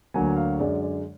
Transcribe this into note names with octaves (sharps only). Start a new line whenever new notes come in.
D2 D3 F#3 A#3 G#5
F5
F#2 D3 G#3 D5
D5